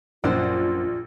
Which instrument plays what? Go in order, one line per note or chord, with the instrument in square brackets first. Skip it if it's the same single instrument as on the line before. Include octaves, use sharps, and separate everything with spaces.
[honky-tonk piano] A#1 [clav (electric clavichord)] F#2 [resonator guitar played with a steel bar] D4 F#4 C5 [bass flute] F4